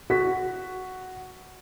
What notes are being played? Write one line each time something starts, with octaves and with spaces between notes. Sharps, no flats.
F#4 B6